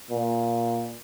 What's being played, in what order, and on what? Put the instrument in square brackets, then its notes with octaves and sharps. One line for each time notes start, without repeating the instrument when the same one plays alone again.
[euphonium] A#2